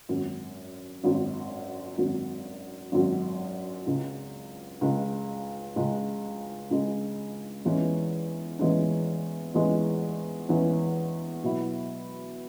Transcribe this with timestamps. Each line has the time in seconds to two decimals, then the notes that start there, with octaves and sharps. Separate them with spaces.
0.09 G#1 F#2 F#3
1.04 G#1 F#2 F#3
1.98 G#1 F#2 F#3
2.92 G#1 F#2 F#3
3.87 C#2 C#3 G#3
4.81 C#2 C#3 G#3
5.76 C#2 C#3 G#3
6.70 C#2 C#3 G#3
7.65 E2 E3 G#3 C#4
8.59 E2 E3 G#3 C#4
9.54 E2 E3 G#3 C#4
10.49 E2 E3 G#3 C#4
11.43 B2 F#3 E4